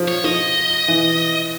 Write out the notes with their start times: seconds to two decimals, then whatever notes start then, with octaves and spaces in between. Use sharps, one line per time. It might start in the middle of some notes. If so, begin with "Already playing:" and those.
Already playing: F3
0.08 C#5
0.24 F3 D#5
0.88 E3